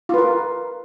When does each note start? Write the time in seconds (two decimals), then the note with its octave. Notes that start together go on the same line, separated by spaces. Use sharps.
0.09 F4
0.14 B4
0.18 A#4